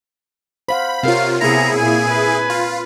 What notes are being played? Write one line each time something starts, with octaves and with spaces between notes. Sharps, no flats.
C5 F5 F#5 B5
C3 C4 F4 A#4 C#5 F5
C3 B3 E4 G#4 A#5
A#2 A#3 G#5
B4
F4